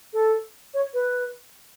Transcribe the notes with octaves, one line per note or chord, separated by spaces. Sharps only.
A4
C#5
B4